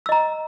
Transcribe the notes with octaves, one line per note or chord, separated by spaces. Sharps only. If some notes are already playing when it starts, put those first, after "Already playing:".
D#5 A#5 E6